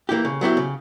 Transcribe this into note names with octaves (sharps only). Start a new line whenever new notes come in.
E3 A#3 E4 G4
C#3
F#3 B3 E4 G4
C#3